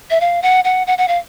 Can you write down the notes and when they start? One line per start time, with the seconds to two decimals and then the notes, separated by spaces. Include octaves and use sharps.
0.10 E5
0.21 F5
0.42 F#5
0.64 F#5
0.87 F#5
0.98 F#5
1.08 F5